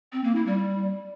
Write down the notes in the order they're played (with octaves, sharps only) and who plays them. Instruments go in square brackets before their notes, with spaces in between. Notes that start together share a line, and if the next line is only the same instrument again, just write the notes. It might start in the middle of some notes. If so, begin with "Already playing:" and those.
[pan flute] C4
A#3
E4
G3